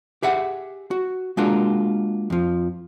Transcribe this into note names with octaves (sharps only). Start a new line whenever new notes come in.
G4 G#4 E5 F#5
F#4
G#3 A#3 D4 F4 F#4 A#4
F2 F3